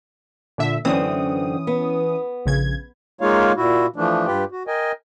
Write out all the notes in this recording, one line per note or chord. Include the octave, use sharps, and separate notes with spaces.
A#2 D3 E5
F#2 D3 E3 C4 C#4 D#6
B3
A#1 C#3 G#6
G#3 A#3 D#4 F4 C#5 F5
A#2 E4 F#4
E3 F3 A3 D4
G2 F4 G4 B4 G5
F#4
A#4 D#5 G5 G#5